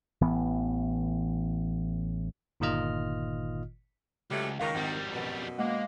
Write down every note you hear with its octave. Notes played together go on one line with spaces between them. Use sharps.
A1 E3 B3
G1 A#2 D#3 F4 D#5 F6
C#2 F#3 G3 A3
C#2 D#3 F5 C#6 A#6
G#1 F2 G3
F#2 B2
G#3 A#3 F5 F#5